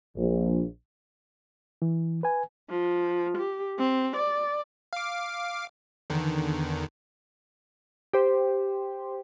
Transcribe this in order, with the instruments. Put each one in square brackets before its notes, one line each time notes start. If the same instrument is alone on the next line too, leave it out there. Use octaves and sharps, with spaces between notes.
[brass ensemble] A#1
[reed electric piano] E3
B4 G#5
[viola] F3
G4
C4
D5
[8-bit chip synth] F5 D6
E2 D3 D#3
[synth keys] G4 C5